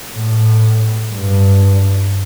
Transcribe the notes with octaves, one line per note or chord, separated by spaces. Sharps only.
A2
G2